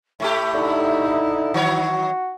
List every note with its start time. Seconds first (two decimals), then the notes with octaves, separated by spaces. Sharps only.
0.20 A2 A3 G4 E5
0.54 D3 D#4 E4
1.54 D#3 F#3 F#4 C#5